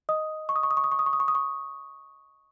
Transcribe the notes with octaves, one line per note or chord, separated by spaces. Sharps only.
D#5 D#6
C#6
D#6
C#6
D#6
C#6
D#6
C#6
D#6
C#6
D#6
C#6
D#6
C#6